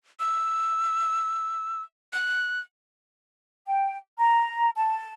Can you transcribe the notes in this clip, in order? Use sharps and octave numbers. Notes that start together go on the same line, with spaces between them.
E6
F#6
G5
A#5
A5